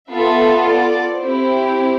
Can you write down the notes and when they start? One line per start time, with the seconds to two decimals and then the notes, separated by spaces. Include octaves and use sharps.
0.11 B3 F4 A4 E5
0.67 D5
1.22 C4 E4 G4 C5